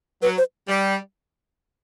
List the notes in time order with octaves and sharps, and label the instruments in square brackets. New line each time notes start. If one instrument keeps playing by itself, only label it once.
[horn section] F#3 [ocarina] B4
[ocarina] C5
[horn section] G3